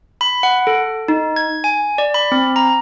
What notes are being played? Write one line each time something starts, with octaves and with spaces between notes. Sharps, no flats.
B5
F#5
A4
D#4
G#6
G#5
D5
B5
C4
A#5